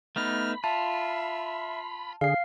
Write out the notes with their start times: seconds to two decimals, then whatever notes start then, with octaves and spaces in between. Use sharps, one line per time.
0.16 A3 B3 D#4 B5 F6
0.64 F4 E5 A5
2.21 D3 G#4 F5 C7